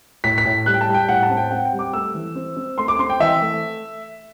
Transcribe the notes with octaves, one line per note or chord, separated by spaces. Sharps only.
A2 B6
B6
A2
G3 F#6
G5
A5
G3
G5
A2 F#5
A5
C4
G5
C4 F#5
G5
G3
D6
A3 E6
E3
C4
C4
A3 C6
D6
C4 C6
G5
E3 E5
A3